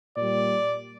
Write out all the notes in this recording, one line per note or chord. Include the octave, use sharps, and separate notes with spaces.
A#2 G3 D5